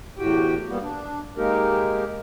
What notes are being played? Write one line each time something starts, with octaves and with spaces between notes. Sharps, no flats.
E2 A2 F#4 G4 G5
G3 A#3 B3
D4
G#3 A#3 D#4 G4 A#4